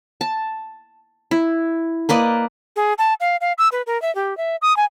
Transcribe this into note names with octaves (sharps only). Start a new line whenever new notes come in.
A5
E4
A#3 B4 D5 D#5
G#4
A5
F5
F5
E6
B4
A#4
E5
G4
E5
D#6
G#5